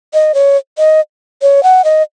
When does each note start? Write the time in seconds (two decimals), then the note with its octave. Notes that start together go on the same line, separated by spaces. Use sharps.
0.14 D#5
0.34 C#5
0.78 D#5
1.42 C#5
1.63 F#5
1.84 D#5